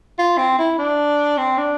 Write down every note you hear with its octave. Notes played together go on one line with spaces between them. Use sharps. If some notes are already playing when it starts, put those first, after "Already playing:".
F4
C4
E4
D4
C4
D4